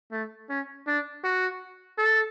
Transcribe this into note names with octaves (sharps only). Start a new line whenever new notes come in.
A3
C#4
D4
F#4
A4